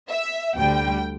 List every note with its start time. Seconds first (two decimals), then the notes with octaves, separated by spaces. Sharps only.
0.09 E5
0.56 D2 D3 G3 G5